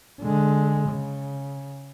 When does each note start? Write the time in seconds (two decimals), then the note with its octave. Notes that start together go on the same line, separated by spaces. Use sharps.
0.21 D3 G#3
0.89 C#3